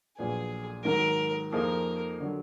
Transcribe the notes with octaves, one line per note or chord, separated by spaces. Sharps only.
A#1 A#2 F#3 B3 G#4
G#2 D#3 F#3 A#4
F2 F3 A#3 D#4 G#4 A#4
D3 F#3